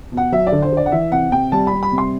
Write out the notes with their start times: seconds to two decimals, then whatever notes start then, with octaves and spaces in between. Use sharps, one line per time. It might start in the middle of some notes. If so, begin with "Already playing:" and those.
0.12 B2
0.17 F#5
0.32 F#3 E5
0.47 D5
0.52 D3
0.62 C5
0.72 D3 D5
0.86 F#5
0.92 E3 E5
1.12 C3 F#5
1.32 C3 G5
1.52 G3 A5
1.67 B5
1.73 G3
1.83 B5
1.92 C3
1.98 C6